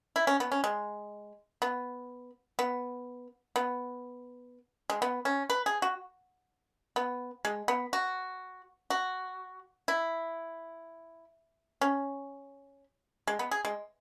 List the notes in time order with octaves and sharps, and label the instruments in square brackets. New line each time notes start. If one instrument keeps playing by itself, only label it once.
[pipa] E4
C#4
B3
C#4
G#3
B3
B3
B3
G#3
B3
C#4
B4
G#4
F#4
B3
G#3
B3
F#4
F#4
E4
C#4
G#3
B3
G#4
G#3